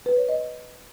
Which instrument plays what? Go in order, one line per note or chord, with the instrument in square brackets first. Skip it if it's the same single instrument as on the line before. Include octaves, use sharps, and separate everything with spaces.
[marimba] B4
C#5
D#5